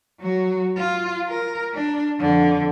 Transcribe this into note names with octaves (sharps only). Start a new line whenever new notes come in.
F#3 F#4
F4
A#4
D4
F2 D3